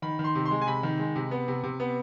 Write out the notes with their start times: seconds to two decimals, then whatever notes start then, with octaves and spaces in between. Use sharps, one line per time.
0.02 D#3 B5
0.19 D#3
0.24 C6
0.35 C3
0.45 C6
0.51 G#3
0.61 G#5
0.67 C3 B5
0.83 D#3
0.99 G#3
1.16 C3
1.31 B3
1.48 C3
1.63 C3
1.80 B3